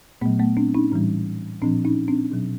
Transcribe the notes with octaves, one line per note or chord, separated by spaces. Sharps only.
A#2 F#3 A3 B3
A3 B3
C4 D4
C#4 D#4
A2 E3 G3
A#2 F3 C4 D4
C#4 D#4
C4 D4
B2 F#3